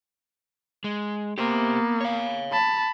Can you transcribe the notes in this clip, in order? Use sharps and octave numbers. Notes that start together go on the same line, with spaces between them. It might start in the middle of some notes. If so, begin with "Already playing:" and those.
G#3
A#3 B3 G4 C5
C#5 F5
A5 B5